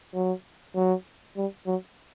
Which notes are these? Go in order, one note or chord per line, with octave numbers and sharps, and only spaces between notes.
F#3
F#3
G3
F#3